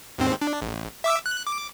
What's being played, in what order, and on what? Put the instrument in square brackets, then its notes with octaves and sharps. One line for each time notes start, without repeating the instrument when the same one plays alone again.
[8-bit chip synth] D#2 G#2 C4
D4
A1
E5 D6 E6
F#6
D6